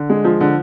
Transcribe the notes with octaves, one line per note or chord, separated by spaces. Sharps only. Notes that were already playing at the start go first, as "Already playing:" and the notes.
Already playing: D3
G#3
F3
D3